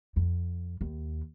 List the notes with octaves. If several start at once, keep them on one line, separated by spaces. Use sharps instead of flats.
F2
D#2